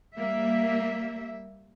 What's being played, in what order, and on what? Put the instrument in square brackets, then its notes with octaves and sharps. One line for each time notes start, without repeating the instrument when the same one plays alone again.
[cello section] G3 A#3 E5